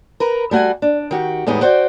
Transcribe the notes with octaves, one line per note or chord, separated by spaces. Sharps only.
A#4 B4 A#5
G3 A3 F#4 F#5 G#5
D4
D#3 F#4 G4
E2 A2 G#3 B3 D#4 G4
F#4 C5 D5 E5 G5